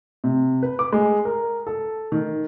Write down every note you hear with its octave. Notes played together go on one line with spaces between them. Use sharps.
C3
B4
D6
G#3
A#4
A4
D#3